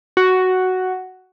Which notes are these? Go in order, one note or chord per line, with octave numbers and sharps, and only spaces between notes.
F#4